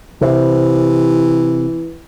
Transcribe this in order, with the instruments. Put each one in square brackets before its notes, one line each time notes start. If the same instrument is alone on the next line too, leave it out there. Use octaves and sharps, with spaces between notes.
[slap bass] C3 [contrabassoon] E3